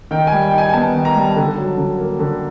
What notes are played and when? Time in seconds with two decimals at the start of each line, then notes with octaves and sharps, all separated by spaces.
0.11 D#3 G5
0.27 G3 G#5
0.42 G5
0.53 D#4
0.58 G#5
0.69 G#5
0.73 B3 A5
0.94 D#3
1.05 A#5
1.16 G3
1.21 A5
1.37 D3
1.58 F#3
1.78 D3
1.98 A#3
2.19 D3